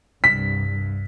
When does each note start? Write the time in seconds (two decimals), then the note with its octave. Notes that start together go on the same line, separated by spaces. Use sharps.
0.24 C2 G2 B6